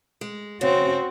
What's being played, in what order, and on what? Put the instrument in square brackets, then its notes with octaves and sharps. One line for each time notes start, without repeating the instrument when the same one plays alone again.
[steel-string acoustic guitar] G#3
[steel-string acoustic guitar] C#3 [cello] C4 F#4